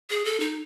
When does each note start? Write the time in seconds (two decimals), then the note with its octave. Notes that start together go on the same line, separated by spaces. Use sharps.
0.10 G#4
0.25 A4
0.40 D#4